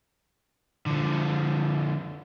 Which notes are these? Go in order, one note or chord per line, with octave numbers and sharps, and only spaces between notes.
D3 F3